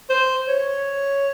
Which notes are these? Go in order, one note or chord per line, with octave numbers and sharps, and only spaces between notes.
C5
C#5